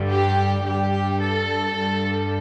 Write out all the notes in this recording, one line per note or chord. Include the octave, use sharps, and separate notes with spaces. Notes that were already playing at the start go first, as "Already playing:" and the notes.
Already playing: G2 D3 G3
G4
G2 G3 G4
A4
G2 G3